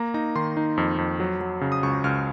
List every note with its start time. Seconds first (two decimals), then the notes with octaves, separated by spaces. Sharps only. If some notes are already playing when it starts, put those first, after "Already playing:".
Already playing: A#3 A#5
0.14 D#4 A#5
0.35 D#3 C6
0.57 D#4
0.78 F2
0.98 F2
1.20 F#3
1.41 F#3
1.61 C#3
1.72 D#6
1.83 C#2 C#6
2.04 C#2 F6